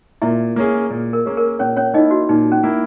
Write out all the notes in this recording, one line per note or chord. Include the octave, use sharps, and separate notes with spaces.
A#2 E4 E5
A#3 C#4 G#4
A#2
A#4
A#3 C#4 G#4
A#4
A#2 C#4 C#5
C#4 C#5
A#3 D#4 E4 D#5
F#4
A#2 D#4
C#4
A#3 E4